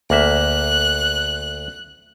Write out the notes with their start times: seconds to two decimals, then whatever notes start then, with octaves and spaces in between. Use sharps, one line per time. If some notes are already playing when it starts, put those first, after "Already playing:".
0.10 D2 A#3 E5 F#6